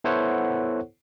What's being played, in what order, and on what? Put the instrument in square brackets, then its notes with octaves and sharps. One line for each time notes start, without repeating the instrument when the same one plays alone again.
[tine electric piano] B3 E4 A4 C5 C#5 F#5